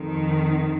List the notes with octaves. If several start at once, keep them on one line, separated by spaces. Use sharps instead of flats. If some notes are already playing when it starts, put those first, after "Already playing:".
Already playing: F2 D#3